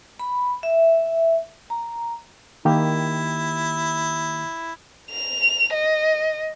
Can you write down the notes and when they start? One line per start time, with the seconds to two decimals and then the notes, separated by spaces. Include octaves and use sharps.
0.19 B5
0.63 E5
1.70 A#5
2.65 D#3 A#3 E4 G4
5.11 F7
5.74 D#5